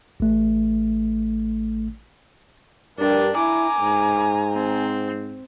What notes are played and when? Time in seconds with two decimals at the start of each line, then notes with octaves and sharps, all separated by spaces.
0.20 A1 A3
2.99 G2 D4 G4 A#4
3.36 E4 G#5 A#5 D6
3.81 G#2
4.53 C4